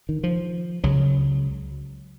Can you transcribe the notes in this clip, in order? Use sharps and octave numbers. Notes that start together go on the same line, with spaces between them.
D#3
F3
C#2 C#3 F#3